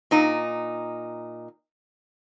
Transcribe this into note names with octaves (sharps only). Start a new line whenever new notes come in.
A#2 D#4